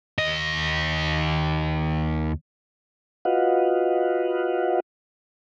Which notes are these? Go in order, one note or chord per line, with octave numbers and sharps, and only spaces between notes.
D#2 D#5
F4 F#4 B4 D#5 F5 F#5